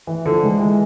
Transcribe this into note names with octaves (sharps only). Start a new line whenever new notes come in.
E3
D3 F3
E3 G#3
E3 G#3